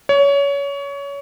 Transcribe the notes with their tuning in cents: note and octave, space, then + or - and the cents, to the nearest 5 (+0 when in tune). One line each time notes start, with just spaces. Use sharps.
C#5 +25